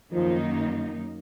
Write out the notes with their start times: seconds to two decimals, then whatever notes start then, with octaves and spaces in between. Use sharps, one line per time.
0.12 F#2 D#3 F3 A#3 D#4